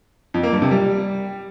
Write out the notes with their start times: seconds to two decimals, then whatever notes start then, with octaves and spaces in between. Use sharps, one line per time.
0.34 F2
0.43 A#3
0.53 G2
0.62 C3
0.71 G3